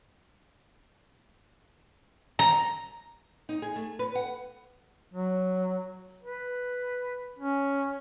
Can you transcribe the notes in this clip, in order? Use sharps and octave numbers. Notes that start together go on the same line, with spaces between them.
A#5
D#4
G#4
A3
B4
F#5
F#3
B4
C#4